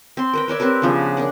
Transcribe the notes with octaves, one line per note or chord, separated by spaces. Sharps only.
C4 C6
A#4 B4 G5
A#4 C#5 D5 E5
C4 G4 A#4 B4
C#3 F3 B3 D4
D4 A#4 F#5